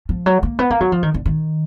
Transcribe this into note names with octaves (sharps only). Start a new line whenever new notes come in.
F3
F#3
A#3
B3
A#3
F#3
F3
D#3
D3
D#3